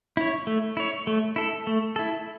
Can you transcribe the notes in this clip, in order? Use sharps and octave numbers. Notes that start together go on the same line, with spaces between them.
E4 C#5
A3
E4 C#5
A3
E4 A4
A3
E4 A4